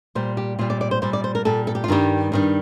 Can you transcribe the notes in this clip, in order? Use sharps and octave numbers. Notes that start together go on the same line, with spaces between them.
A#2 G3 C5
G4
A#2 G3 F4
D5
D5
C5
A#2 G3 C5
D5
C5
A#4
A#2 G3 A4
A4
G4
F4
G2 D#3 G3 G4
G2 D#3 G3